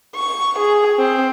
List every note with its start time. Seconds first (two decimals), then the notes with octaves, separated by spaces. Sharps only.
0.16 C#6
0.59 G#4
0.99 C4